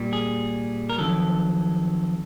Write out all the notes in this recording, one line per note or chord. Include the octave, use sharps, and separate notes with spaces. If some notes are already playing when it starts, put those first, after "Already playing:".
Already playing: A#2 G3
G#4
A#4
F2 C3 D#3 F#3 A4